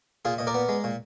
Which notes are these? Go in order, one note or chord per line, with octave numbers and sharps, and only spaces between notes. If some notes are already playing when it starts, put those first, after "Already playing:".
A#2 F4 G#4
A#2 D#5
A#4 D5
B3
G#3
A#2